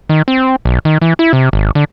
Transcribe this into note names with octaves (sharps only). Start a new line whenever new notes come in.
D#3
C4
B1
D#3
E3
E4
C3
G#1
D3